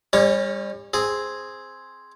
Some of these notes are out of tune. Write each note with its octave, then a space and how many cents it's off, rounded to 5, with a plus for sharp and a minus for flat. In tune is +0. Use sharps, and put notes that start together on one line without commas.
G3 +35 C#4 -35 C#5 +0
C4 +0 G#4 +0